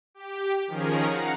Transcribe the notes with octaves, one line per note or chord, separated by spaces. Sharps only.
G4
D#3 F3 C#4 G#4 A#4
F5 F#5 A#5 C#7